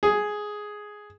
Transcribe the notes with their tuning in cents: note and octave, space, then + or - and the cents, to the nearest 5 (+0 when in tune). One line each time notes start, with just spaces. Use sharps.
G#4 +5